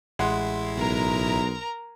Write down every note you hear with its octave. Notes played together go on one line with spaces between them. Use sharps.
A1 G#3 E4 F#5 C6
B1 A#4 A#5